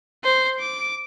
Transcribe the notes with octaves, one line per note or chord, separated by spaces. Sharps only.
C5
D6